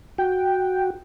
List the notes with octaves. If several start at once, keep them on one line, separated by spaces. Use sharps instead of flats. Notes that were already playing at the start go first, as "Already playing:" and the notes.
F#4 G5